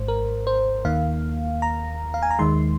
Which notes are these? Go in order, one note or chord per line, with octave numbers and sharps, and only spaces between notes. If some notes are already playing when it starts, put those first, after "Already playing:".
Already playing: G#1 G#2 C5
A#4
C5
D#2 D#3 A#3 F5
A#5
F5
G#5
A#5
D#2 D#3 G#3 C6